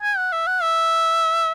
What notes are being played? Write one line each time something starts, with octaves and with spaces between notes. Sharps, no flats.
G#5
F#5
E5
F#5
E5